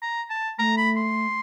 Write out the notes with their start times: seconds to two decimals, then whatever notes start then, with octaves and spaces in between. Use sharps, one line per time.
0.02 A#5
0.30 A5
0.59 A3 A#5
0.77 B5
0.96 C6